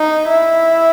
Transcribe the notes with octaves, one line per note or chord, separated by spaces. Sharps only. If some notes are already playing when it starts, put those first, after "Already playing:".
Already playing: D#4
E4